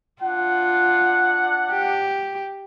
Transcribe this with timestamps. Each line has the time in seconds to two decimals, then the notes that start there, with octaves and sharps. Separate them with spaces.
0.23 D4 F4 F#5
1.71 G4